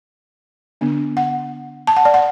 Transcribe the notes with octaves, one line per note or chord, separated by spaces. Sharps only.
D3 B3 D4
F#5
A5
F#5
D5
F#5